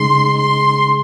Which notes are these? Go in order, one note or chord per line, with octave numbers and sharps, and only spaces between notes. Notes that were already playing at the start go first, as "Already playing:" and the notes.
Already playing: C#3 G#3 D#4 G#4 C6
C6